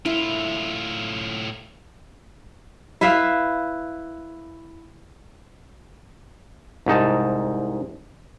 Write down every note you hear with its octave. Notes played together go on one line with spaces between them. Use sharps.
A2 E4 F4
E4 B4 E5 F5
C2 G#2 D#4 A5